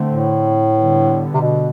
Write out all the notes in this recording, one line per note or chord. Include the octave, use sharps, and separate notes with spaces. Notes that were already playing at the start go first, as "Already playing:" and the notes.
Already playing: D3 A3 C4
A2
D3 G3 B3
C3
B2